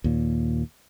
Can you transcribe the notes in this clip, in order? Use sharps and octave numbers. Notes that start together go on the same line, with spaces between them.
D#2 A#2